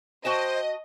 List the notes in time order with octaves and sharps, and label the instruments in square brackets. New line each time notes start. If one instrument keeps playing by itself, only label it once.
[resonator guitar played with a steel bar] F#4 G5 A5 [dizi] C5 [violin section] D#5